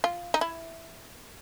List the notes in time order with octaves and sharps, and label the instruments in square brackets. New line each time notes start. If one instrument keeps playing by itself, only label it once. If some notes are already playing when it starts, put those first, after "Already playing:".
[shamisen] F4
D#4
E4